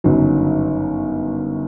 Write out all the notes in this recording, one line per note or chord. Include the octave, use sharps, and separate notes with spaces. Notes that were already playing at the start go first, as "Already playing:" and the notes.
G1 F#2 C#3 F#3 D#4